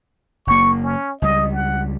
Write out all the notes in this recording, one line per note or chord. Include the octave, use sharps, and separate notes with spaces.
F#1 A#3 C#6
C#4
C#2 G3 D#5
F#5